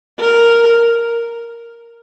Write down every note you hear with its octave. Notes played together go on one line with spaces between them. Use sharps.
A#4